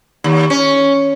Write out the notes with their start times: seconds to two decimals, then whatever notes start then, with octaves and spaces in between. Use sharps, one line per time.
0.24 D#2
0.50 C#4